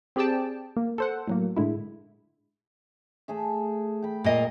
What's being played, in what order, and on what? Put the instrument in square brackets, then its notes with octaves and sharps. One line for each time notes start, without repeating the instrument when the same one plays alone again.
[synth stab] C4 G4 G#4 D5 G5 A5
A#3
A4 C5 F#5
A2 F#3 A#3
A2 D3 G#3 E4
[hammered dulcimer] A3 G#4 E5
G5 B5
[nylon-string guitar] A#2 A#3 D#5